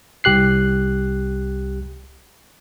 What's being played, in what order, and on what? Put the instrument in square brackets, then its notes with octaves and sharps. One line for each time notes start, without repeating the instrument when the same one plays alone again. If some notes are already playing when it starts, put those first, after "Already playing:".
[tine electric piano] C2 G4 F#6 C7